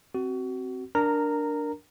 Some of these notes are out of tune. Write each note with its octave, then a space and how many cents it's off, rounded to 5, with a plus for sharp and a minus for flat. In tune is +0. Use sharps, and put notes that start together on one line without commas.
C4 +0 F#4 +25
D4 +0 A#4 +0 A#5 -15